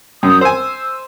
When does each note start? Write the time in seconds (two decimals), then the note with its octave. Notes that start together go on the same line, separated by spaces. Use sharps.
0.23 F#2 D#6 G6
0.41 C5 G#5 E6